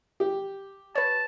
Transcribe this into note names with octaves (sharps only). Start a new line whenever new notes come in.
G4
B4 C#5 A5